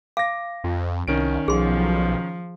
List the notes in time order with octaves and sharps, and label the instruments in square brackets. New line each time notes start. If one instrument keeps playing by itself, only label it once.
[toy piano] F5 [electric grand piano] D6 A#6
[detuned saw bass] F2
[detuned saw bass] C2 [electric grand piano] D#3 C#4 D7
[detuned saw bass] B1 [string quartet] F3 [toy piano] G#4 C6